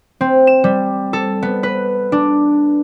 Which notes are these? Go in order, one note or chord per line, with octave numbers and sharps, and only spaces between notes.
C4
E7
G3
A4
B3
B4
D4